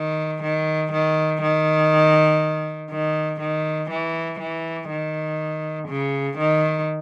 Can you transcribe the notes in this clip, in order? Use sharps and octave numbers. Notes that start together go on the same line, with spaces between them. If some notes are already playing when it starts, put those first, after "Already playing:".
Already playing: D#3
D#3
D#3
D#3
D#3
D#3
E3
E3
D#3
C#3
D#3